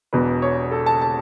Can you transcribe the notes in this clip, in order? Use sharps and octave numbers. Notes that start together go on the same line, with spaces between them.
E1 E2 B2 B4
C#5
A4
A5
A5